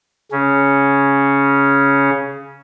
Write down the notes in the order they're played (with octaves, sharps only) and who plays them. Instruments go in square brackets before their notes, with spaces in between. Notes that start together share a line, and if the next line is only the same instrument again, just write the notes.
[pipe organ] C#3 C#4